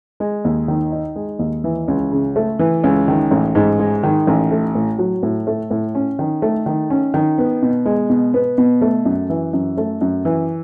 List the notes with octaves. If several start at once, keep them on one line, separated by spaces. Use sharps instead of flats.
G#3
D#2
D#3
D#4
G#3
D#2
E3
C#2
C#3
A3
E3
C#2
D#3
A1
G#2
G#3
D#3
A1
A3
A2
F#3
A2
A3
A2
C#4
D#3
A3
D#3
C#4
D#3
B3
B2
G#3
B2
B3
B2
A3
F#2
E3
F#2
A3
F#2
E3